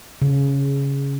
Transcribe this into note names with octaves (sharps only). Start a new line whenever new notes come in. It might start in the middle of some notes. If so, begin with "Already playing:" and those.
C#3